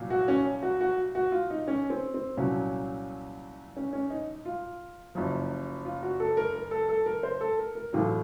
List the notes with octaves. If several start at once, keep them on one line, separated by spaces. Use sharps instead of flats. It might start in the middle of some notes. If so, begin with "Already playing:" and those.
Already playing: C2 A#2 F#3
F#4
C#4
F#4
F#4
F#4
F4
D#4
C#4
C4
C4
C2 A#2 F#3 C#4
C#4
C#4
D#4
F4
F#1 F#2 F3
F4
F#4
A4
A#4
A#4
A4
A4
A#4
C5
A4
A#4
A#4
A1 A2 F#3 F4